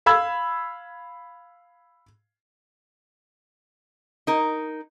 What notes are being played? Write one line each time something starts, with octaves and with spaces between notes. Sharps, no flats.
F5 B5 E6 G#6
D#4 A#4